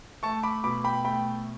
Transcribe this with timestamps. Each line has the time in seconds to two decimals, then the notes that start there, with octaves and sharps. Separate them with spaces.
0.23 A3 A5 C#6
0.43 B5 D6
0.64 B2 B5 D6
0.84 G5 B5
1.05 A3 G5 B5